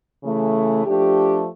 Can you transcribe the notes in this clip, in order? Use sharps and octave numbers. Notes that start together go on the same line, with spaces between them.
C#3 E3 A3
F3 A3 D4 G4